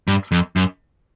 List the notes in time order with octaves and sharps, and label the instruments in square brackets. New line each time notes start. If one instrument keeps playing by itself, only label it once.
[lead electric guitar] G2
F2
F#2